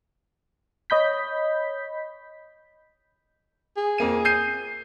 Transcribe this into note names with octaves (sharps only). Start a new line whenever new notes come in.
C#5 D#5 B5 G6 B6
G#4
F2 A#3 D#7
G6 C7 D#7